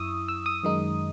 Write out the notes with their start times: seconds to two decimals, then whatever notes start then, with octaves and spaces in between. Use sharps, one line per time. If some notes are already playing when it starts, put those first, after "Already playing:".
Already playing: F#2 E4 C#6 D#6 E6
0.28 E6
0.46 D#6
0.64 F#2 D#3 G#3 D#4